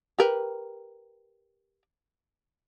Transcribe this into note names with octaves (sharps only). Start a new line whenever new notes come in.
G4 A#4 B4